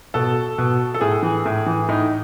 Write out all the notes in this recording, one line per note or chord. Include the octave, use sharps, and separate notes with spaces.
B2 A4
B2
A4
A2 G#4
E3
A2
E3
A2 D#4